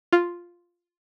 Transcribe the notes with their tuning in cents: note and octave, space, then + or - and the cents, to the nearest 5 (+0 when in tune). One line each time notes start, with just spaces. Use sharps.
F4 +0